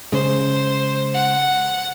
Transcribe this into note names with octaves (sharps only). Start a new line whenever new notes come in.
C#3 G#3 C5
F#5